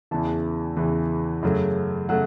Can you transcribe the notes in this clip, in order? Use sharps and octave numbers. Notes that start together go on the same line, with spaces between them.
E2 C#3 E3 A5
E2 C#3 E3
F#2 C#3 F#3 A3
C#3 F#3 A3 F#5